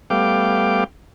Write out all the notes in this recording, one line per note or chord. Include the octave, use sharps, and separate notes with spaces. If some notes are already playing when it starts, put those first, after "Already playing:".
G3 A3 B3 F5 G5 D6